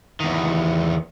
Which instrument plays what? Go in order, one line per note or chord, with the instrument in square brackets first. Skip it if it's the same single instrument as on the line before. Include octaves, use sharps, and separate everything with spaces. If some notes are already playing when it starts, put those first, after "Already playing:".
[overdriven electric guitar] E2 D#3